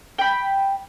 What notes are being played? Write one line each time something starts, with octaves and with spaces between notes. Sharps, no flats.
G5 B5